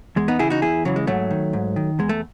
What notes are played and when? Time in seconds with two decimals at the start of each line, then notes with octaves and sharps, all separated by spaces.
0.16 E2 G#3
0.28 B3 D#4
0.39 C#3 E3 E4 G#4
0.50 D#4 F#4
0.62 E2 E4 G#4
0.85 C#3 E3 F#3
0.96 G#3
1.07 G#2 F#3 A3
1.31 D#3
1.53 G#2
1.76 D#3
1.99 E2 G#3
2.09 A3